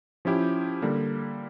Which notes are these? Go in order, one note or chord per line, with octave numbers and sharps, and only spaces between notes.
F3 C#4 E4 G4
D3 G3 A#3